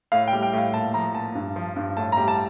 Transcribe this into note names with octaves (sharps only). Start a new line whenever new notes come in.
A2 F5
G5
G3
G5
A2
F5
A#2 A5
F3 A#5
A#2 A5
G2
F3
G2
A2 A5
G3 A#5
A5